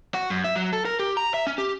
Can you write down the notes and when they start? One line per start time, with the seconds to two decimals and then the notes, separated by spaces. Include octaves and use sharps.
0.14 F#4
0.30 F#2
0.44 E5
0.56 F#3
0.73 A4
0.85 A#4
0.99 G4
1.17 A#5
1.34 E5
1.47 C#4
1.58 G4